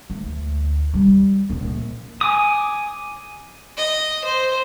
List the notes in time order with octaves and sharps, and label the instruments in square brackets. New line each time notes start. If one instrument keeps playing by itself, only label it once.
[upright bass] D2
G3
A#1 C#3
[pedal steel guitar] G#5 D6 D#6
[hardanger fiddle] D#5
C5